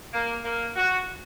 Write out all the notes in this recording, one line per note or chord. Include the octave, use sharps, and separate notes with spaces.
A#3
A#3
F#4